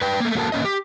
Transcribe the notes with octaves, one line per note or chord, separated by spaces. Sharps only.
B4 D5 G5
A3 A#3
A#3 F#4 A4 A#4 A5
A#3 C#4 D#5
G4